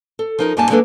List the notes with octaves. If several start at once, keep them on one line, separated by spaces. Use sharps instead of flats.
A4
F3 D#4 A#4
F#2 G3 A#3 D#4 G#5 A5
F#3 G#3 A#3 D4 A4 B4